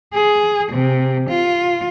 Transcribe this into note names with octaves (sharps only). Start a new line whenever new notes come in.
G#4
C3
F4